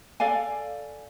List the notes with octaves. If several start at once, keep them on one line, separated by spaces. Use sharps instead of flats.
A4 D5 F5 G#5